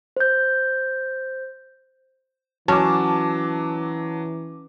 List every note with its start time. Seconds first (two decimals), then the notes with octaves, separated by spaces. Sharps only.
0.17 C5 G6
2.68 E3 F#3 C#4 A5 D6